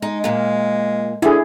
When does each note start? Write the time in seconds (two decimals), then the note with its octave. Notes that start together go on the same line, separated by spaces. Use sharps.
0.02 G#3 D#4
0.24 A#2 A#3
1.22 D3 E4 G#4